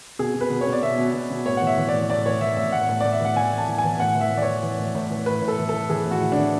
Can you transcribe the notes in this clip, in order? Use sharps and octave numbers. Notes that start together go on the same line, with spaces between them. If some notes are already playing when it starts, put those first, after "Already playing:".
B2 G#4
B2
B4
B2
C#5
B2
D5
B2 E5
B2
B2
B2
A2 C#5
F#5
E3 E5
E3
D5
A2
A2 D5
E3 C#5
E3 E5
A2 E5
A2 F#5
A2
A2 D5
E5
E3 F#5
E3 G#5
A2
A5
E3
G#5
E3
A2 F#5
E3
E5
A2
D5
E3 C#5
E3
A2
A2
E3
A2 B4
A2
A4
E3
E3 A4
E3 G#4
A2
F#4
E3
D4
E3